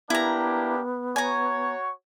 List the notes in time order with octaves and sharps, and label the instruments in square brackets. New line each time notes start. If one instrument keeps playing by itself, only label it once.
[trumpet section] A#3 D4 G4 [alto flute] B3 [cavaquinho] E4 A#5
[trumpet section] F#4 C#5 [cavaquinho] G#5 A#5